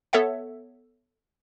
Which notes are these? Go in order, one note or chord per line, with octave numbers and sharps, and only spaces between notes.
B3 A4 C#5 E5 F#5